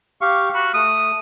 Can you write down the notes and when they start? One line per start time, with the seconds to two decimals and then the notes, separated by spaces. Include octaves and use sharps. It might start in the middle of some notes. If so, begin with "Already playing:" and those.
0.21 G4 F5 C#6
0.55 F#4 B5
0.74 A3 D#6